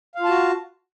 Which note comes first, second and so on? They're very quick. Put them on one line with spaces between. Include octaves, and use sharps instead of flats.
F5 F4 A5 F#4